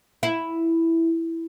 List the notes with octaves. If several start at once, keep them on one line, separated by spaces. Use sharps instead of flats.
E4